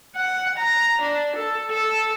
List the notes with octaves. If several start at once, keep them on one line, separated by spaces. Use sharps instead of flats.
F#5
A#5
D4
A4
A4